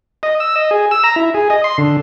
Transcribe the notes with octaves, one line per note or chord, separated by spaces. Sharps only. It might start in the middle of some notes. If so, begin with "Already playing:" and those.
D#5
E6
D#5
G#4
E6
A#5
E4
G#4
D#5
C6
D3